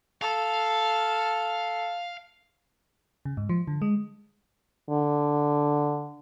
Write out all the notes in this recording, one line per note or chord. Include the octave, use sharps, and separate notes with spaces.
A4 F5
C#3
G#2
F3
D3
G#3
D3